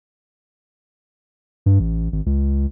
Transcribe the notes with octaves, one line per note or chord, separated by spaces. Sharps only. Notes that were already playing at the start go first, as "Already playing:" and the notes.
G2
A1
G#1
C#2